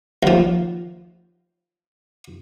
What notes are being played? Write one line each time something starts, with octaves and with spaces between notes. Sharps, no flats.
D#2 F3